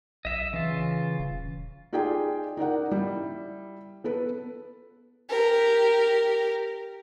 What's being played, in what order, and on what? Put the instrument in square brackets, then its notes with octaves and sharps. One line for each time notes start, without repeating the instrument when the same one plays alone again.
[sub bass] B1 [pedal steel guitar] D#5 E5 E6
[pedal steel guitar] C#3 F4 [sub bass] E3
[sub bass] D#1
[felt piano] D#4 F4 G4 G#4 D5 G5
D#4 A#4 D5 F#5
G3 E4
B3 A4 B4
[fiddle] G4 A#4